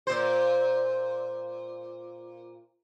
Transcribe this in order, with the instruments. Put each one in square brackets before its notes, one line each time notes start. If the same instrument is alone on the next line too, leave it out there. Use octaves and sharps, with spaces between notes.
[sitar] A#2 C5